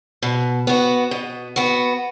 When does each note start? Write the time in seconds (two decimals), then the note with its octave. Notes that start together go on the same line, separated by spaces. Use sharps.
0.22 B2
0.67 B3 F#4
1.11 B2
1.56 B3 F#4